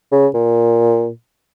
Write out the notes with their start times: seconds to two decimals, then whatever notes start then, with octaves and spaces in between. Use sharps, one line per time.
0.12 C#3
0.34 A#2